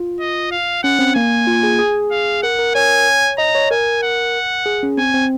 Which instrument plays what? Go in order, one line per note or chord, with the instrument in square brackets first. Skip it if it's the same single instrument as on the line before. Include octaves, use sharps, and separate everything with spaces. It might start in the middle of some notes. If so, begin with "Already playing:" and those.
Already playing: [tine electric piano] F4
[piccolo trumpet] D#5
F5
[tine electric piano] C#4 [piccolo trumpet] F#5
[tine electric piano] C4
[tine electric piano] A#3 [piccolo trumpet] G#5
[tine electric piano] F4
G#4
G#4
[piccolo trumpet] F5
[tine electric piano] A#4 [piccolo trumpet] F#5
[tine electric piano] A#4
[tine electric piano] C#5 [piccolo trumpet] G#5
[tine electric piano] D#5 [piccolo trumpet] A#5
[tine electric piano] C#5
[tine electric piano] A#4 [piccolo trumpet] G#5
[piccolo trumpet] F#5
[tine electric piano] G#4
C#4
[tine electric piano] C4 [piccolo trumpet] G#5
[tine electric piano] C4